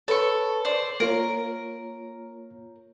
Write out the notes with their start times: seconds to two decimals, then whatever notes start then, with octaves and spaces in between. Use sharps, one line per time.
0.08 A4 B4 C#5 C#6
0.65 C5 D5
1.00 A#3 F4 A#4 C#5